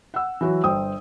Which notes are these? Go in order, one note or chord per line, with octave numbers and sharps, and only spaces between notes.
F#5 E6
E3 F#3 F#4
G1 C5 G5 D#6